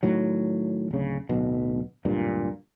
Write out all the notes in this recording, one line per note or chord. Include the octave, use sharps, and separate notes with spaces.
A2 D#3 F#3
D1 C#3
D1 B1 B2
D1 G2 A#2